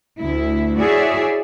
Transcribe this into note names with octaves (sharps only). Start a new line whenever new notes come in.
D2 E4
E4 F#4 G#4 C#5 D5 E5